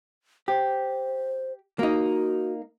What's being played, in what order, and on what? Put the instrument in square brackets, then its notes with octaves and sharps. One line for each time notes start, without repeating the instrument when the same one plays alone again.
[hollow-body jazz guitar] G4 [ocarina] C5
[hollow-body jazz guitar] A#3 D#4 [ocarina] F#4